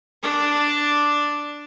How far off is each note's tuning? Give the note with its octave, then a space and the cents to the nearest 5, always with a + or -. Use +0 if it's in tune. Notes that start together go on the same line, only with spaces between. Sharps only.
D4 +0 D5 +0